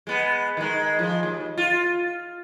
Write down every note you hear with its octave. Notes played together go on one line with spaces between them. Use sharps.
G#3 B3
D#3 G#3
F3 G#3
D#2
F4